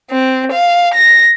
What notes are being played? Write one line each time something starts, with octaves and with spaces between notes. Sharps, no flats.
C4
F5
A#6